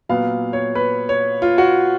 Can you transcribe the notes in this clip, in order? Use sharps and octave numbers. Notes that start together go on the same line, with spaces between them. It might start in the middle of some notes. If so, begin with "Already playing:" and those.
A#2 F#3 B3 F5
C#5
B4
C#5
F4
F#4